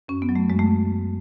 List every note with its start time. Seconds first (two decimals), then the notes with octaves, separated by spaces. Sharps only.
0.08 F#2 C#4
0.22 B3
0.29 F#3
0.36 A3
0.50 F#2 G#3
0.59 A3